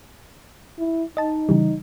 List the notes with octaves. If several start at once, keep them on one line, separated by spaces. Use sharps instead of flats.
E4
D#4 D#5 A5
C#3 E3 G3